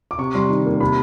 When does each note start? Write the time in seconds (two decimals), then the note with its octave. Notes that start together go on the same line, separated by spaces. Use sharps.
0.11 D6
0.18 C3 C#6
0.35 G3 C6
0.49 D#3
0.66 A#3
0.80 C3 B5